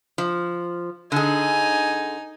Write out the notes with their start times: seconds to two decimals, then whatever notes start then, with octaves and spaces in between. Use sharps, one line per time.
0.18 F3
1.12 D3 D#4 G#4 G#5